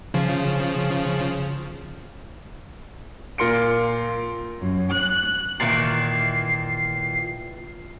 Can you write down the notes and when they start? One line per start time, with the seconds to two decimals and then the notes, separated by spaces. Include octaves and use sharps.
0.14 C#3 F3
3.38 A#2 F4 A#4 C6 C#7 D7
4.59 F#2
4.92 F#6
5.60 A#2 D#3 E3 C7